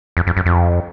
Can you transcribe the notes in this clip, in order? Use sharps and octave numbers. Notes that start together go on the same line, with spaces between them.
F2
F2
F#2
F2